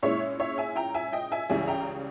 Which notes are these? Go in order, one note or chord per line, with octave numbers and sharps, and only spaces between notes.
A#2 G#3 C#4 E4 C#5 E5
C#5 E5
E5 G#5
G5 A#5
E5 G#5
D#5 G5
E5 G#5
C#2 C#3 E3 G3 E5 G#5
G5 A#5